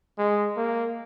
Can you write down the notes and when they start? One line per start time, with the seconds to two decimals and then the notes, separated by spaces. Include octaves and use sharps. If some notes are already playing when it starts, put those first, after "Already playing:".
0.18 G#3
0.57 A#3